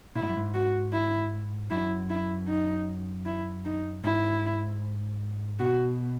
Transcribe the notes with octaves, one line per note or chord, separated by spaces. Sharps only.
A#2 E4
G#2
F#2
G#2
F#4
E4
F#2 E4
E4
D#4
E4
D#4
G#2 E4
B2 F#4